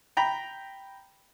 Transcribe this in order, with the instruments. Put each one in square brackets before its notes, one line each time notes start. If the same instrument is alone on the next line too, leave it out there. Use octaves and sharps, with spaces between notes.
[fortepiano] G5 A#5 B5